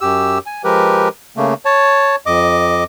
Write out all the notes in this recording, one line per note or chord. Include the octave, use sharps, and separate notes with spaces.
F#2 G4 E6
G#5
F3 G#3 G4 A#4 B4
C#3 A3 A#3
C#5 A5
F2 D#5 D6